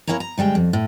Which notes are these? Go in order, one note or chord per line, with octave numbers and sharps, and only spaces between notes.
A#3 D4 E4 C#5 G#5 A#5
A#5
D2 G3 G#3 G5
F2
A2